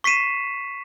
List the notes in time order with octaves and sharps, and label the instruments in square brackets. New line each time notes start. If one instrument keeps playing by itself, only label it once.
[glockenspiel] C#6 B6 C7 D#7 E7